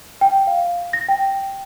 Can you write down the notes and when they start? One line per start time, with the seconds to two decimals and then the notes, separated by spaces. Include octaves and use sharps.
0.21 G5
0.47 F5
0.93 A#6
1.09 G5